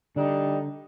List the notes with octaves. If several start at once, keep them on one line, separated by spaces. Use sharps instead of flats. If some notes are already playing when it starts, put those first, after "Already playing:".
D3 G3 D4 D#4